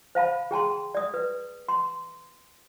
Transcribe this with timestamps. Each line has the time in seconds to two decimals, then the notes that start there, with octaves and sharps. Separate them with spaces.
0.15 C5 F5 A5 B5
0.51 G#4 G5 A5 C6
0.95 D5 D#6
1.14 B4
1.69 C6